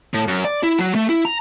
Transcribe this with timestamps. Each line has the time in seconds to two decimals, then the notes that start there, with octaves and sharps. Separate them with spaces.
0.14 A2
0.28 F#2
0.45 D5
0.63 E4
0.79 F#3
0.95 A3
1.09 E4
1.25 A#5